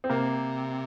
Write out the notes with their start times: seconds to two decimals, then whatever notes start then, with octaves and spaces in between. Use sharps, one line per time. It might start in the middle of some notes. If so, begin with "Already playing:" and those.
0.04 C4
0.10 C3 A#3